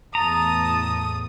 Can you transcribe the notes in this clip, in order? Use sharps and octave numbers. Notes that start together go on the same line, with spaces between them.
E2 A2 A5 A#5 D#6